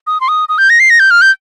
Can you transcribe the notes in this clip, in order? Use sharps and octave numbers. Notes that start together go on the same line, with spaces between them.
D#6
C6
D#6
D#6
G6
A#6
C7
A#6
G6
F6
G6